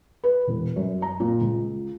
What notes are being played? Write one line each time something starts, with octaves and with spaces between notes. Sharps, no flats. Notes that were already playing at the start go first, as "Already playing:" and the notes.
B4
E1
F#2
A#5
A#2
C#2